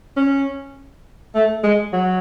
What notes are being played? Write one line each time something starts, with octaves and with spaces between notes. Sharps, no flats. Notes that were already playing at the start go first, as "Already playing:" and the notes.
C#4
A3
G#3
F#3